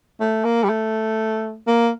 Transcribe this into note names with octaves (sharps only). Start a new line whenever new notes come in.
A3
A#3
G3
A3
A#3